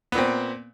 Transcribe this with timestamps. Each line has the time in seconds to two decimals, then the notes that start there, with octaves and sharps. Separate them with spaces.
0.12 B3
0.15 A#2
0.18 C4